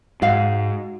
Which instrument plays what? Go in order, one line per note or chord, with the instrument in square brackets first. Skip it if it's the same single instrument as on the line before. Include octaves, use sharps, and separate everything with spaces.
[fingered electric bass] G#2 [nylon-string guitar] F#4 F5